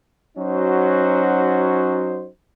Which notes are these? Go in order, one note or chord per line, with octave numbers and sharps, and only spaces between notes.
F#3 C#4 D#4 F#4 C5